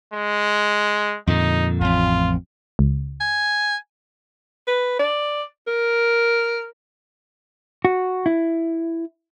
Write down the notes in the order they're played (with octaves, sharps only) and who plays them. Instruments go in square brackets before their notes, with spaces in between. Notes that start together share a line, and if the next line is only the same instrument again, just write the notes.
[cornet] G#3
[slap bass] F2 A#2 D3 [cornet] D#4
[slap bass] A1 F2 [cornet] F4
[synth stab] C#2
[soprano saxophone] G#5
[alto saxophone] B4
D5
A#4
[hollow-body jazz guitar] F#4
E4